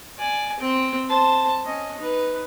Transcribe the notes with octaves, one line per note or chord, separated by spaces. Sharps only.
D5 G#5
C4 G5
C5 A5
C#4 D#5
D#4 B4